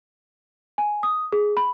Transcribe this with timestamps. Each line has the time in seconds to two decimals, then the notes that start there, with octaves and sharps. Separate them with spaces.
0.78 G#5
1.03 D#6
1.32 G#4
1.57 B5